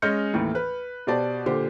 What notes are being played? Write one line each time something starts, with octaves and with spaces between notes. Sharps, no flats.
G#3 C#4 D#5 F6 G6 C#7
D#2 A2 E3
B4
B2 G4 C5 D5 A5
A#2 D3 G4 C5